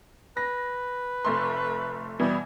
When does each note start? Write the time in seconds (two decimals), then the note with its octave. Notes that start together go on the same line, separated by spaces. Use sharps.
0.37 B4 A#6
1.25 F1 A3 C6
2.19 B2 E3 G3